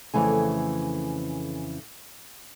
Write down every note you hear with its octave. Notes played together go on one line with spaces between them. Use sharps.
F2 C#3 E3 A3 G#5